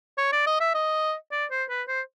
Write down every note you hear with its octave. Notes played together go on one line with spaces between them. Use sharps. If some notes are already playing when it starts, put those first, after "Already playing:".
C#5
D5
D#5
E5
D#5
D5
C5
B4
C5